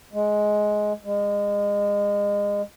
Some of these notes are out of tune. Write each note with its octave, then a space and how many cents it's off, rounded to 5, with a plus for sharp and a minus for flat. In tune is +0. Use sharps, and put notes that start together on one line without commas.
G#3 +15
G#3 -30